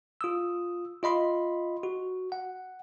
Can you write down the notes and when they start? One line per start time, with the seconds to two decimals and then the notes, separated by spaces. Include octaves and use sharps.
0.21 F4 D#6 E6
1.03 F4 D#5 B5 C6
1.83 F#4
2.32 F#5